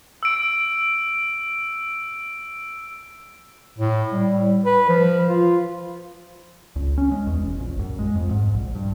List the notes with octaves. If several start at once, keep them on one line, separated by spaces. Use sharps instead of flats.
E6 D7
A2
G3
B4
F3
F4
C#2
C#4
G#3
E2
E1
A#1
F#2
G#3
F2
G#2
A#1
G2